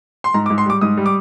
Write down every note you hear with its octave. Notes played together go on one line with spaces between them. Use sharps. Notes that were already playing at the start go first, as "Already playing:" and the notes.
C6
G#2 A#5
D6
G#2
C6
G3 D6
G#2 D#6
G3
D6